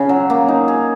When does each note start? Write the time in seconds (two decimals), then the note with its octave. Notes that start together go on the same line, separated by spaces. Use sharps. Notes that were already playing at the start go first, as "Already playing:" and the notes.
Already playing: C#3 C#4
0.09 F#3
0.30 A#3
0.48 D#4
0.68 G#4